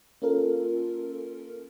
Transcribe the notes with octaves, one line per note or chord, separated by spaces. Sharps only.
A#3 C#4 F4 A4 A#4